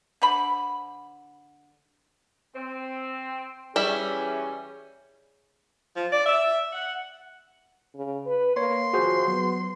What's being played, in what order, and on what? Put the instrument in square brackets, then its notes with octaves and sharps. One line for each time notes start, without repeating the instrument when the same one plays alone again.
[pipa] D3 C5 A5 B5
[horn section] C4
[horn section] E3 C#4 [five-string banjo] G3 E4 E5 [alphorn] G#4
[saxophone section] F3
D5
E5
F#5
[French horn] C#3
B4
[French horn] A#3 [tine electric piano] C#5 [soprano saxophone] C6
[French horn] F3 [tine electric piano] F#4 G#4 C5
[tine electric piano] F#3 [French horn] B3